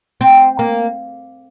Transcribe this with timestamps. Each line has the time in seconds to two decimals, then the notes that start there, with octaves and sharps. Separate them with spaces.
0.21 C4
0.59 A#3